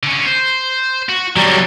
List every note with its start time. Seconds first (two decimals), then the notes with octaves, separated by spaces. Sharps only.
0.03 D3 C#4
0.25 C5
1.09 F#4
1.37 D3 F#3 G3